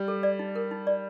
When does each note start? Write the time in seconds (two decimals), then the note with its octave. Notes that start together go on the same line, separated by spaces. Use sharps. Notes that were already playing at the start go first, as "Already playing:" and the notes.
Already playing: G3
0.08 A4
0.23 D5
0.39 D#4
0.55 A#4
0.71 D#4
0.87 D5